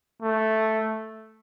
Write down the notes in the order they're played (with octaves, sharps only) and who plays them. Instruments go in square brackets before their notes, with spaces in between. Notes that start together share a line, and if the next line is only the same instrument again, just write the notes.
[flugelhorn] A3